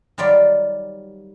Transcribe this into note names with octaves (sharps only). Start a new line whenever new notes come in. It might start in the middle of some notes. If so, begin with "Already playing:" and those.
D#3 F#3 G3 F4 D5